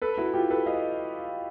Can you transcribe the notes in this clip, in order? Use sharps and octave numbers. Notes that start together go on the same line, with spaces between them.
A4 B4
E4 F#4
F4 G4
A4 B4
D#5 F5